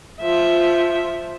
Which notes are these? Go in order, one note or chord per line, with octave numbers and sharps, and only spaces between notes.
F3 E5